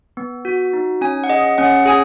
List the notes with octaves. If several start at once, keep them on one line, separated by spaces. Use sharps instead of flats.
B3
F#4
D#4
C#4 G#5
F#5
G#4 D#5
C#4 F#5
G#4 G#5